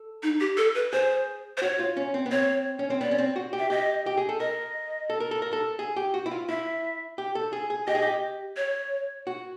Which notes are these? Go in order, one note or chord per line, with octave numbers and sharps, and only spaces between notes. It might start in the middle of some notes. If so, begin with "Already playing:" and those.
Already playing: A4
D#4
G4
A4
B4
G#4 C5
C5
F#4 C#5
F4
C#4
C4
B3
C4 C#5
C#4
C4
B3 D5
C#4
C4
F#4
G4
E5
G4 D#5
G4
G#4
A4
A#4 D#5
A4
A#4
A4
A#4
A4
G#4
G4
F#4
E4
F4
E4 E5
G4
A4
G#4
G#4
G4 D#5
G#4
G4
C#5
F#4